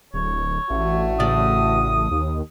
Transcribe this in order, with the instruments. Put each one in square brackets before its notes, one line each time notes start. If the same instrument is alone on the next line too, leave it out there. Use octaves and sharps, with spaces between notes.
[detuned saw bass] D1 [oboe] C#5
[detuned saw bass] A1 [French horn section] G2 A3 F#4
[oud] A2 C#3 D5 [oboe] D#6
[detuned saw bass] D#2